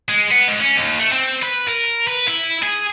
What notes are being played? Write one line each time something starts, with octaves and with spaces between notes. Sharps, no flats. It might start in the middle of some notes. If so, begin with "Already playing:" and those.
G#3
B3
G#2
C#4
D#2
A3
C4
B4
A#4
B4
E4
G#4